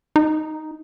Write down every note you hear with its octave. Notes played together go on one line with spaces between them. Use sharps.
D#4